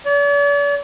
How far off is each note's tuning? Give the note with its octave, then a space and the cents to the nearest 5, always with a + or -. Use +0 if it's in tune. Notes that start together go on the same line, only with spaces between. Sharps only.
D5 -45